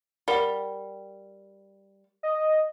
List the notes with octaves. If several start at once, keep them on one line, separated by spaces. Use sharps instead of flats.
G3 A#4 F#5 G7
D#5